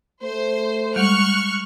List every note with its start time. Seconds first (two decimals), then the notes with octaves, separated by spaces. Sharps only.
0.23 A3 C5
0.96 G3 G#3 C#6 F6 F#6